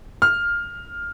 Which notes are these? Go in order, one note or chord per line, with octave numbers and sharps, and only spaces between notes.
F6